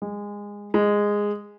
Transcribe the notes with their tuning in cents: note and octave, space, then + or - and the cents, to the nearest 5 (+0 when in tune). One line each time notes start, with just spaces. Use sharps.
G#3 -20
G#3 -10